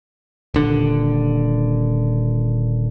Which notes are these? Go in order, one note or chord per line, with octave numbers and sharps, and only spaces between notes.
D#1 D3